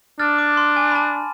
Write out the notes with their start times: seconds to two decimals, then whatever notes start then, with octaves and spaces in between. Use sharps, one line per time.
0.19 D4 F6 A6
0.39 D6
0.57 C6
0.76 G#5
0.91 B5
0.95 A5